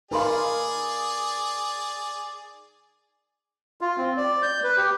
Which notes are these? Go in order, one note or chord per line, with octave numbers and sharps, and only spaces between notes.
D#4 G#4 A#4 B4 D5 F5 B5 C6
F4
C4
D5
G6
B4
G4